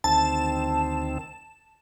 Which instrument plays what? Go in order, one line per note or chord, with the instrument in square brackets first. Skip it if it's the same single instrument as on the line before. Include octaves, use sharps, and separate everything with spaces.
[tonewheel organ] D2 D#3 C4 [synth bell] A5